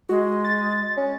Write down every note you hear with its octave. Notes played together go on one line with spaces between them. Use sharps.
G#3 F#4
A6
C#4